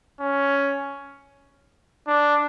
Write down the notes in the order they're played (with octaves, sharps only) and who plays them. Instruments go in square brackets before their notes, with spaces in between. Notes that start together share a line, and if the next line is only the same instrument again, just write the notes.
[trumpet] C#4
D4